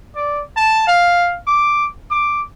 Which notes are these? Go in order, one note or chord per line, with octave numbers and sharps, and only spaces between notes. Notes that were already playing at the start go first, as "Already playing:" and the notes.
D5
A5
F5
D6
D6